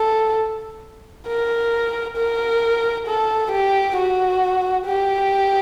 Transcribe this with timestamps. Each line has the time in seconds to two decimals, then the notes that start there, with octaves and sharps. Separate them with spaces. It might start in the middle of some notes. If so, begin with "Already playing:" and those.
Already playing: A4
1.27 A#4
2.17 A#4
3.07 A4
3.52 G4
3.96 F#4
4.86 G4